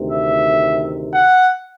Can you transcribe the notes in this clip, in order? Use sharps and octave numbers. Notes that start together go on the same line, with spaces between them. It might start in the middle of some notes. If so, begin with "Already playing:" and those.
Already playing: D2 C3 D#3
E5
F#5